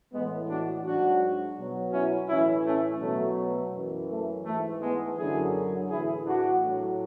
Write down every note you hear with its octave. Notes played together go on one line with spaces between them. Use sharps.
A2 E3 G#3 B3
D4 F#4
G#2 F#3 D4 F#4
B2 F#3
C#4 E4
A2 E3 C#4 E4
A3 C#4
B2 F#3 A3
F#2 E3
A3
G#2 E3 A3
G#3 B3
F#2 D3 F#3 E4 G#4
A2 E3 E4 G#4
D4 F#4
A2 F#3